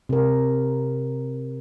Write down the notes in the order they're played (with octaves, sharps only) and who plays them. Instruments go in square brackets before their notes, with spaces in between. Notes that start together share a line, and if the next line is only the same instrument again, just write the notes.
[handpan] C3 A#4